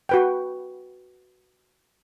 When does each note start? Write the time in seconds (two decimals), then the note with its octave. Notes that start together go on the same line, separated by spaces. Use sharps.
0.09 F#4 B4 G5